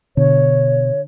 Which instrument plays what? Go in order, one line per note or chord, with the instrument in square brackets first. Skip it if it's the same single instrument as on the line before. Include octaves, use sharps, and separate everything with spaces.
[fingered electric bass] B2 [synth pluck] D3 [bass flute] C#5